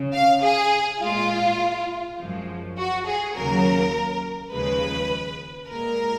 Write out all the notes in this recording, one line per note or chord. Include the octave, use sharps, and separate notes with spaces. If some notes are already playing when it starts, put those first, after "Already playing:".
Already playing: C#3
F5
G#4
A#2 G#3 F4
F#2 F3 G#3
F#4
G#4
D#2 C#3 F#3 A#3 A#4
D#2 C#3 F3 G#3 B4
A#2 G#3 A#4